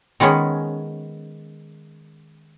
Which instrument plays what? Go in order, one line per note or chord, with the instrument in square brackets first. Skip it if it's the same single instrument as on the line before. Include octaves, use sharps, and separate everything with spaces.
[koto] D#3 G#3 B3 C#4